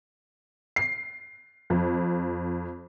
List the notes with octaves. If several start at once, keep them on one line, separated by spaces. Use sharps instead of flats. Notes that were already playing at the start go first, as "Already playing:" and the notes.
C7
F2